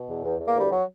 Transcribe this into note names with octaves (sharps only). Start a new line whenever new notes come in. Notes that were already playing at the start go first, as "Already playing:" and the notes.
Already playing: B2
E2
E2
E2
A#3
D2 G3
F#3